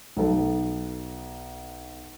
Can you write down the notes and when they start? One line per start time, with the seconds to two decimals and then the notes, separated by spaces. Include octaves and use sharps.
0.17 B1 A4